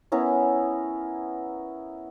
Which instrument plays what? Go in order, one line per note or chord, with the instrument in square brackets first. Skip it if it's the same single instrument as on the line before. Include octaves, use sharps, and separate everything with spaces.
[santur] B3 C#4 E4 A#4